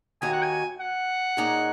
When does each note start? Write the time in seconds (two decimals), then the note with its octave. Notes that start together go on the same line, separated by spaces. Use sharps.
0.22 D#2 D#3 A#3 F#4 C#5 G#5
0.33 F#5
0.42 G#5
0.80 F#5
1.37 A#2 A#3 D#4 G#4 C#5